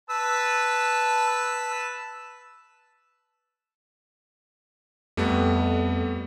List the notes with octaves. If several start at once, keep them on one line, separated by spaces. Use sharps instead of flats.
B4 A5 E6
F2 G3 A3 B3